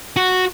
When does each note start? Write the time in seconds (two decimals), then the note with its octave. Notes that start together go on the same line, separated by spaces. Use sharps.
0.17 F#4